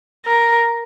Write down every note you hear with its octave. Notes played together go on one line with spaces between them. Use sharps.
A#4